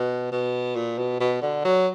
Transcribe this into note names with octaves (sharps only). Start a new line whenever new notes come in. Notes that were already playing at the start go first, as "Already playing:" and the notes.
Already playing: B2
B2
A#2
B2
B2
D3
F#3